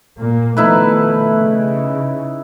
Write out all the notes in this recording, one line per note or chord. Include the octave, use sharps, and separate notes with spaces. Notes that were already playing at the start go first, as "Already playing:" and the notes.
A#2 A#3
B2 D#3 F3 A3 D#4 E4 B4
C#3